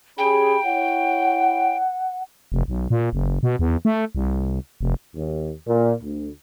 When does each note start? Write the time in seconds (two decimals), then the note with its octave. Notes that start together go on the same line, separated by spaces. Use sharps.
0.18 C#4 G4 G#4 G5 B5
0.65 E4 C#5 F#5
2.52 F1
2.68 B1
2.90 A#2
3.13 F#1
3.43 B2
3.59 E2
3.85 A3
4.15 C2
4.81 F1
5.16 D#2
5.66 A#2
6.03 D2